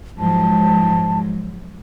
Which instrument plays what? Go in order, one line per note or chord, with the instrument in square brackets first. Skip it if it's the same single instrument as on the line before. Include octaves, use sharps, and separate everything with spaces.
[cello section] G#2 F3 F#3 [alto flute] A5